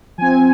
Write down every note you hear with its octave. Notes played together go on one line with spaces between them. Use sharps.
F3 C4 G#5